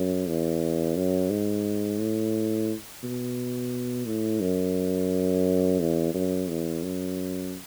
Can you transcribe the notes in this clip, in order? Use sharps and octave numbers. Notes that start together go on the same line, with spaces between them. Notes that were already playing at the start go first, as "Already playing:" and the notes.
Already playing: F#2
E2
F#2
G#2
A2
B2
A2
F#2
E2
F#2
E2
F#2